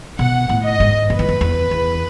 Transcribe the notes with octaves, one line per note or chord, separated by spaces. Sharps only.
B2 F#5
A2
D#5
G#2
F#2 B4
E2
F#2
E2
E2